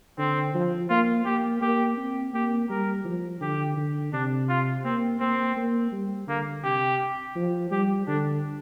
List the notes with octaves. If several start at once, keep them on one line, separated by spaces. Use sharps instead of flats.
D3 C4
F3
A#3 F4
A#3 G4
A#3 G4
C4
A#3 G4
G3 A#4
F3
D3 G4
D3
C3 D4
F4
A#3 C4
A#3 C4
A#3
G3
D3 A#3
C3 G4
F3
G3 G4
D3 D4